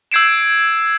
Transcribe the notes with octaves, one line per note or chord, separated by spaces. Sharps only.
E6 G6 G#6 C7 D7 E7